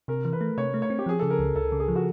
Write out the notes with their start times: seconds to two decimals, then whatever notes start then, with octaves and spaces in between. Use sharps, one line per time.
0.08 C3 A#4
0.25 E3
0.33 B4
0.41 A3
0.58 C3 C#5
0.74 A3
0.82 C#5
0.90 C4
0.99 G4
1.06 F3 G#4
1.19 C#3 A4
1.30 A#4
1.39 C#2
1.55 C#2 A4
1.72 C#3
1.80 G#4
1.88 F3
1.95 F#4